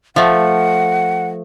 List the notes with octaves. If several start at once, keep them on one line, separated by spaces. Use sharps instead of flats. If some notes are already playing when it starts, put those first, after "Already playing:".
F3 A3 F#5